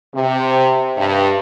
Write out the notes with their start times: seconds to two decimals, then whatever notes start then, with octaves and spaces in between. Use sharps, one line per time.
0.15 C3
0.97 G2